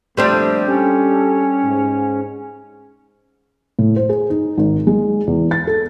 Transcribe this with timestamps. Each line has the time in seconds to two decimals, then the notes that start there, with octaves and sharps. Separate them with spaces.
0.17 F2 A#2 G3 A3 C4 D4
0.67 C#4 G4 A4
1.64 G#2
3.79 A2
3.96 C5
4.09 G#4
4.30 D#4
4.58 G#1
4.87 G#3
5.27 E2
5.51 A6
5.67 A4